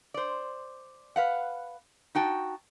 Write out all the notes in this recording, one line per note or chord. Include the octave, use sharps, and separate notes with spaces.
C5 D5
B4 F5 F#5
D#4 F#4 G5 A5